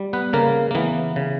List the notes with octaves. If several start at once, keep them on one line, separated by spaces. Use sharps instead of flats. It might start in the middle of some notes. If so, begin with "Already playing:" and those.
Already playing: G3
B3 B4
C#3 A#3 A#4
A#3
E3 B3
C#3